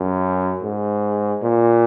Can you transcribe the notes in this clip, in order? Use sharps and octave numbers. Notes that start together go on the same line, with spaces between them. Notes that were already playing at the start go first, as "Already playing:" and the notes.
Already playing: F#2
G#2
A#2